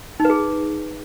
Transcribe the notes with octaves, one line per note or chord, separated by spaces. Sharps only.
D#4
B4
G#4